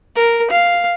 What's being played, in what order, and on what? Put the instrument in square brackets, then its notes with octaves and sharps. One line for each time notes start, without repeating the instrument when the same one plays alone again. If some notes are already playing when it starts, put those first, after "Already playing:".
[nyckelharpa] A#4
F5